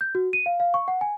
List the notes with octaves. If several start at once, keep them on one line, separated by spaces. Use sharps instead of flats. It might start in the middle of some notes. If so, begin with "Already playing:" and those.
G6
F#4
D#7
F5
F5
C#6
F#5
G#5